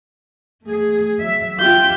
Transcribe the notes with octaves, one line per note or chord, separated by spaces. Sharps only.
A3 G#4
F#3 E5
F4 G4 E5 G5 G6